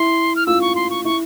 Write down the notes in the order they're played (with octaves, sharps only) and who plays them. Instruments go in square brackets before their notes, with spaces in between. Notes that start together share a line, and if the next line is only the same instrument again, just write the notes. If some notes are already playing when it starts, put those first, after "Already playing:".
Already playing: [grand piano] E4 [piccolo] C6
[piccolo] F6
[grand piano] F4 [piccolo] E6
[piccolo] C#6
C6
C#6
[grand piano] E4 [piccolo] C#6